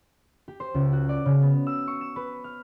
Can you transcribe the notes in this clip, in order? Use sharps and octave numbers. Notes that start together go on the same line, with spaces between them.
G4
C5
C#2
F#4
D5
C#3
B3
E6
C#6
E7
B4
F6